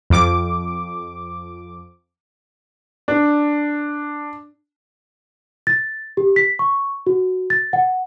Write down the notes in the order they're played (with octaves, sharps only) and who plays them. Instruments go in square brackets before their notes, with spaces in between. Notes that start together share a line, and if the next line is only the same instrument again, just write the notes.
[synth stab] F2 D6
[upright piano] D4
[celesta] A6
G4
B6
C#6
F#4
A6
F#5